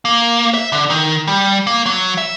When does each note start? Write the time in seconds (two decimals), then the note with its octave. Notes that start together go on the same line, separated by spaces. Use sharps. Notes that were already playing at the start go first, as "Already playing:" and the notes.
0.05 A#3
0.54 E5
0.72 D3
0.90 D#3
1.27 G3
1.67 A#3
1.86 F#3
2.18 E5